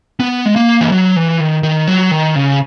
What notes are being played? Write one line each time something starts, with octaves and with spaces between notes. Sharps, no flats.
B3
G#3
A#3
E3
F#3
E3
D#3
D#3
F#3
D#3
C#3